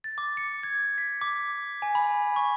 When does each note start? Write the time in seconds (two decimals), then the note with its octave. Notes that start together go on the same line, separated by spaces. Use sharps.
0.04 A6
0.18 D6
0.37 C#7
0.63 G#6
0.98 B6
1.21 D6
1.82 G#5
1.95 B5
2.36 C#6